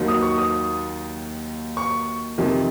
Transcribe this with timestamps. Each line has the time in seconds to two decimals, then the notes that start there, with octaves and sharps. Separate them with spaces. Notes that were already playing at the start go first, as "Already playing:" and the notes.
Already playing: D#2 D#3 F#3
0.08 D#6
0.22 C#6
0.38 D#6
1.77 C#6
2.38 F2 C3 D#3